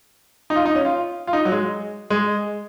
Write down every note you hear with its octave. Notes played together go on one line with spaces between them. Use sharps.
D#4
F4
D#4
C#4
F4
F4
D#4
F#3
G#3
G#3